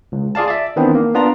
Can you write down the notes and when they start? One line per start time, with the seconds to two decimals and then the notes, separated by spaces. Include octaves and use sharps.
0.12 C#2
0.35 F4 G#4 D5 F5 A5
0.48 D5 E5
0.76 D#3 E3 B3 C4 D4 E4
0.95 A#3
1.14 B3 D4 F4 A#5